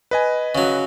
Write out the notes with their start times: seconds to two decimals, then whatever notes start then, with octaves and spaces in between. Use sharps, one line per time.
0.11 B4 D#5 G#5
0.55 C#3 F#3